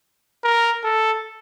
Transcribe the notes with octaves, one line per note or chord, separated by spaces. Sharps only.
A#4
A4